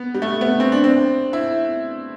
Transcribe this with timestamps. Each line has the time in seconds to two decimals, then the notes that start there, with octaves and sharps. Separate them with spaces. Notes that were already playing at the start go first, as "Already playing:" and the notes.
Already playing: B3
0.14 G3
0.22 A3
0.41 B3
0.60 C4
0.72 D4
0.84 C4
1.33 E4